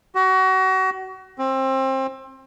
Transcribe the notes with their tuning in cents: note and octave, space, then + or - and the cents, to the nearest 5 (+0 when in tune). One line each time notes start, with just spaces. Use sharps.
F#4 +30
C4 +25